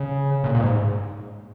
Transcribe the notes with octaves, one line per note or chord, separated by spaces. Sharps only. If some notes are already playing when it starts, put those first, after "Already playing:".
Already playing: C#3
A#2
A#2
G#2